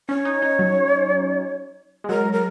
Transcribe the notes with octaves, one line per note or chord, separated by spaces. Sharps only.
C#4 C#5
D#4
D#4
F#3
G#3
F#3 A#4
A#4